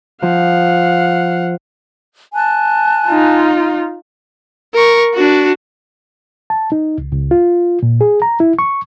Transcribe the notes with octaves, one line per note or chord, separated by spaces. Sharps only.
F3 F5 F#5
G#5 A5 F#6
D#4 F4
A#4 C#6
D4 F#4
A5
D#4
C#2
C#2
F4
A#2
G#4
A#5
E4
C#6